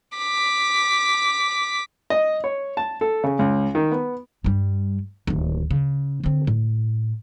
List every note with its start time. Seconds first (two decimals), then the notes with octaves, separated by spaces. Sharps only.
0.17 D6 B6
2.10 D#5
2.44 C#5
2.77 A5
3.01 A4
3.24 C#3
3.39 C#2
3.75 D#3
3.92 B3
4.44 G2 G3
5.27 D1 D#2
5.71 C#3
6.24 D3 C4
6.47 A2